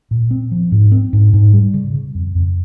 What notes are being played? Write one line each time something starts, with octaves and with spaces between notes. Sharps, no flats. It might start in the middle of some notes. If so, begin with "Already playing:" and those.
A#2
C4
F3
G#2
C4
G#2
G#2
G3
C#3
C#3
F2
F2